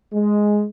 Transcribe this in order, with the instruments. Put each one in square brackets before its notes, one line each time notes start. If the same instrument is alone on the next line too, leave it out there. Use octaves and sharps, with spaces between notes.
[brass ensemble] G#3